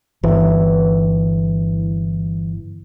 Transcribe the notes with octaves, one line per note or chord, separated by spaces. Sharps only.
G1 E3